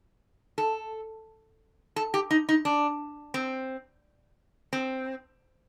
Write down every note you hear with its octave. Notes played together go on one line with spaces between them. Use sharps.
A4
A4
G4
D#4
D#4
D4
C4
C4